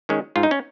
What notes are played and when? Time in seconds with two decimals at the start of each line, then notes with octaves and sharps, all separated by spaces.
0.09 D#3 G#3 C#4
0.36 G#2 F4
0.43 D#4
0.51 C#4